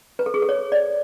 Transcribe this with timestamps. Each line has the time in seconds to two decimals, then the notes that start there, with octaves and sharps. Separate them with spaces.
0.19 B4
0.26 A4
0.34 G#4
0.42 A4
0.49 C#5
0.72 D5